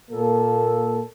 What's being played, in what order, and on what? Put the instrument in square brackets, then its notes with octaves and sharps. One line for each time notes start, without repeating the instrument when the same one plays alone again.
[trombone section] A#2 A#3 A4